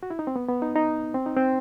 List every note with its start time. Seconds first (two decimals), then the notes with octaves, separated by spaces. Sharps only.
0.03 F#4
0.10 E4
0.19 D#4
0.27 C4
0.36 B3
0.48 B3
0.62 D#4
0.76 D#4
1.14 C4
1.26 D#4
1.36 C4